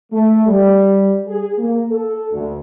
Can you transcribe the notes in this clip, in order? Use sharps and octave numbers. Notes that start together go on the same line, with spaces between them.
A3
G3
G#4
A#3
A4
D2